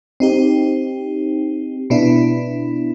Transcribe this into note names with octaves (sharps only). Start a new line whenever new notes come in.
C4 D#4 G4
B2 B3 D4 E4